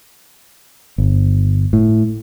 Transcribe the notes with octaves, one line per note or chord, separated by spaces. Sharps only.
G1
A2